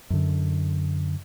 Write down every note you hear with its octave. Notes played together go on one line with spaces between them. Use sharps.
F#2 D3